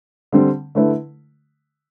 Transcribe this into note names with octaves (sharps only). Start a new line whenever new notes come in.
D3 G3 C4
D3 A3 E4 B4